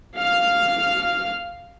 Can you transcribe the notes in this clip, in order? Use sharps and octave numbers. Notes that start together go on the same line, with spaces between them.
F5 F6